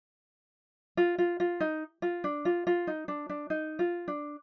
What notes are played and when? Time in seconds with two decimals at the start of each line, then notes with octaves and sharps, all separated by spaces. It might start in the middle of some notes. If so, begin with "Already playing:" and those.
0.97 F4
1.18 F4
1.40 F4
1.60 D#4
2.02 F4
2.24 D4
2.45 F4
2.67 F4
2.87 D#4
3.08 D4
3.29 D4
3.50 D#4
3.79 F4
4.08 D4